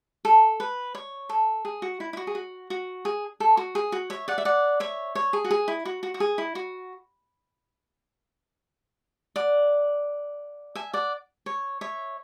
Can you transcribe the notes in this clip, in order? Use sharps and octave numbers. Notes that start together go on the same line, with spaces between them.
A4
B4
C#5
A4
G#4
F#4
E4
E4
F#4
G#4
F#4
F#4
G#4
A4
F#4
G#4
F#4
C#5 E5
D5 F#5
E5
D5 F#5
C#5 E5
C#5
G#4
F#4
G#4
E4
F#4
F#4
F#4
G#4
E4
F#4
D5 F#5
E5 G#5
D5 F#5
C#5
C#5 E5